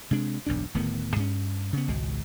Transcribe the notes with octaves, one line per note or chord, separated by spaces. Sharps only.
C3 G#3 D4
E1 B1 G2 D4
D1 A2 D#3 B3
G2 C#4
C#3 B3
G#1 C#2 B2 G#3